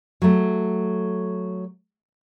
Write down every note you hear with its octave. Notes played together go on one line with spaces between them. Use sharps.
F#3 A3